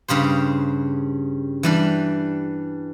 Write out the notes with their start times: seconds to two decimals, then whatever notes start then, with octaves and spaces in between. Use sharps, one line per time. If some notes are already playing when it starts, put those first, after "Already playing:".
0.08 G2 C#3 G4 C5
1.63 E3 G3 D4